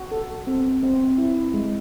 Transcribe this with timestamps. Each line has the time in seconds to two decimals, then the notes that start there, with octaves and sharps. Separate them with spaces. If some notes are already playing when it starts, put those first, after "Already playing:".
Already playing: F#4
0.12 A4
0.47 C4
0.83 C4
1.18 E4
1.54 G#3